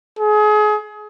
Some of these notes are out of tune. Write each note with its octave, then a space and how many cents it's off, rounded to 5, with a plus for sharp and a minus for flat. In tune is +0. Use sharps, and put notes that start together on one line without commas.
G#4 +30